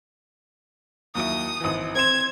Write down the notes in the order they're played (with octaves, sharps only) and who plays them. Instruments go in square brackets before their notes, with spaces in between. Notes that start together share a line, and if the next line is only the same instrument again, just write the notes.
[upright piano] D#2 F#3 E4 [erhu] D#6
[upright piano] G#1 E3
[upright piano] C4 C6 E7 [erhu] G#6